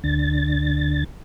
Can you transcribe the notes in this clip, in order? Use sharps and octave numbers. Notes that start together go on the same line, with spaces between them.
D2 D3 A6